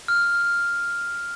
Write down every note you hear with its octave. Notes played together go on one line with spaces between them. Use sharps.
F6